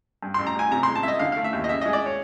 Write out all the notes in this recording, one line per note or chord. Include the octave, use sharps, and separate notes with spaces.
G2
A1 C6
A#5
A1 G#5
C3 A#5
G#3 C6
A5
C2 D#5 E5
D3 F5
A3 F5
E5
D#2
D#5
C#3 E5
G#3 D#5
D5
C#5